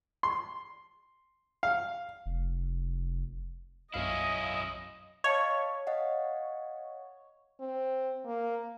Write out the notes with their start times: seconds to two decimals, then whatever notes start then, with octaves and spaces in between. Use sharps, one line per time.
0.23 C6
1.63 F5
2.26 F1
3.94 B1 F#2 C#4 E4 D#5 F5
5.24 C#5 D#5 F5 A5
5.87 D#5 F5 F#5
7.60 C4
8.26 A#3